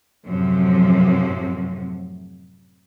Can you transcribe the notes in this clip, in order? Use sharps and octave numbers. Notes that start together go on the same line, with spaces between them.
F#2 A2 C3 F3